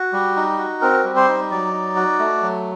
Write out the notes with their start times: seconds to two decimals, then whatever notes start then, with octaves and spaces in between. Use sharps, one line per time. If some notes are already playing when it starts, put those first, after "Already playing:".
Already playing: F#4
0.13 G3
0.36 D#4
0.58 F#4
0.81 C4 A#4
1.04 G3
1.16 C5
1.28 D#4
1.51 F#3 D5
1.73 D#4
1.96 F#4
2.19 A3
2.42 F#3